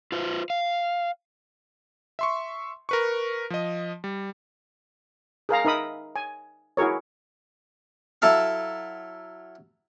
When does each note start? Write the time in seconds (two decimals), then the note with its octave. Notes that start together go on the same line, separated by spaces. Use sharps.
0.12 F4 B4 C5
0.50 F5
2.19 E5 C6 C#6
2.89 A#4 B4 C#6
3.50 F3 D#5
4.04 G3
5.49 G#4 A#4 F5 A#5
5.65 D#4 A#4 E5 B5 D#6
6.16 G#5
6.77 E4 F#4 G#4 A#4 C#5
8.22 F#3 E4 A4 E5 F5